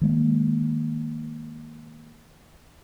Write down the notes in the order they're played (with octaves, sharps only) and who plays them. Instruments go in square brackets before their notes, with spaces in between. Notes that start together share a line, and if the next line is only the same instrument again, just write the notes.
[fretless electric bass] D#3 G#3 A#3